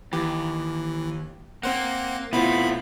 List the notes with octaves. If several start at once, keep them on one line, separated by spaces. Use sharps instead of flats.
D#2 E3 G4
A#3 C4 C5 F#5
B2 A3 B3 C4 E4 F4 B5